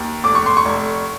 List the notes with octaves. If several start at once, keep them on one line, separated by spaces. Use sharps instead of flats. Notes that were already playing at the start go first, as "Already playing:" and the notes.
Already playing: D#2
F1 D6
C#6
C6
C#6
F1